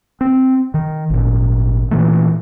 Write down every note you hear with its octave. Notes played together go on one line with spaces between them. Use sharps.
C4
D#3
G#1 A#2
A#2 E3 A3